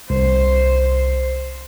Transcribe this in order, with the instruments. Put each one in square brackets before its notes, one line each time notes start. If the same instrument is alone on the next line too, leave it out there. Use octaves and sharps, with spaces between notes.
[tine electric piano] C2 [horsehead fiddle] C5